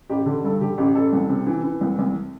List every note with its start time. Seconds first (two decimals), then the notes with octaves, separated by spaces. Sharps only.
0.09 A1 G4
0.26 D3
0.44 G2 A4
0.61 D3 G4
0.78 A1 G4
0.95 A1 A4
1.13 C2
1.30 C3
1.47 E3
1.64 E3
1.81 C2
1.99 C2